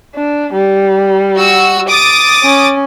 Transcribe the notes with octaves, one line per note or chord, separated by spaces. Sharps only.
D4
G3
F#4 E6
D6 D#6 A6
C#4